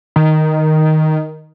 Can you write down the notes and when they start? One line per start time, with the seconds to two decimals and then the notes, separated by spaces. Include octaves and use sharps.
0.16 D#3